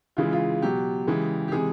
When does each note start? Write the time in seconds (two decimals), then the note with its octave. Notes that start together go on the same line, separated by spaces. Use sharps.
0.17 C#3 E3 G#3 F4
0.33 F4
0.62 B2 F#3 G4
1.07 C#3 E3 G#3
1.48 G4
1.52 C3 E3 G#3 G#4